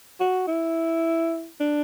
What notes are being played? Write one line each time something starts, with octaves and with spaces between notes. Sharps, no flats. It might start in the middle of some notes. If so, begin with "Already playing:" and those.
F#4
E4
D4